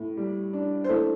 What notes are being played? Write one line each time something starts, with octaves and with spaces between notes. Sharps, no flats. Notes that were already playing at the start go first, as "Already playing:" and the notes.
Already playing: A2
G3
D4
C5
A3 E4 A4